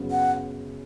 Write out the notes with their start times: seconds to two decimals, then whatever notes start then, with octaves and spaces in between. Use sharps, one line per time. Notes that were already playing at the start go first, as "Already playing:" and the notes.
Already playing: F#2 C#3 F#3 B3
0.11 F#5